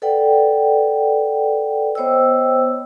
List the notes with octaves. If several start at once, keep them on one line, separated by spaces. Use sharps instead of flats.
A4 B4 D5 F#5 G5
B3 C5 C#5 D#5 G5 E6